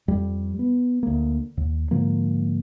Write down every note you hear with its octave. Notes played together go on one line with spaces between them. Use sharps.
F2 G3
B3
D2 A#3
D#2
G#2 D3 F3 A#3